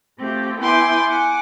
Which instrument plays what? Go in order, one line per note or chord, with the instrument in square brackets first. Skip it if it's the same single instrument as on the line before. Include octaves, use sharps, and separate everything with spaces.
[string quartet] A3 C4 F4 G4
B3 E4 G5 G#5 C6 D6
F#5 G#5 D6